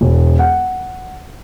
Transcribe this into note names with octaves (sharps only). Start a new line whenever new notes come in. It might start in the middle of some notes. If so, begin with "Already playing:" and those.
E1
F#5